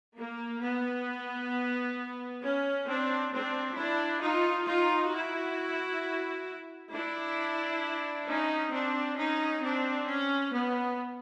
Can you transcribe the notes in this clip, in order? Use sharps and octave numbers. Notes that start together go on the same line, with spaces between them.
A#3
B3
C#4
C4 D4
C4 D4
D4 E4
D#4 F4
D#4 F4
E4 F#4
D4 E4
C#4 D#4
C4 D4
C#4 D#4
C4 D4
C#4
B3